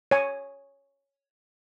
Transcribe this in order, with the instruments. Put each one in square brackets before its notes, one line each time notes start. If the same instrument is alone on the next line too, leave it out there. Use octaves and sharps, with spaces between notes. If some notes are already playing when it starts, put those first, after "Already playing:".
[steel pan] C#5 G#5